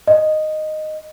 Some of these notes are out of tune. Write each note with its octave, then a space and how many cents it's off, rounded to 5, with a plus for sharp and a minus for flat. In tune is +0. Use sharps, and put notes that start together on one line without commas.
D#5 -5